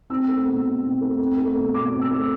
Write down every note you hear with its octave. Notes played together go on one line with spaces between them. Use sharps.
C4 E6
A3
B2
B2
C4
A3
C4
A3
B2
B2 D6
C4
E6
A3